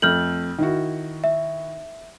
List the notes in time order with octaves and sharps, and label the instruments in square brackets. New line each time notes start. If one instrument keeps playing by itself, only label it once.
[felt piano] F2 A3 [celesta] F6 G6 F#7
[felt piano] D#3 E4 F#4
[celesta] E5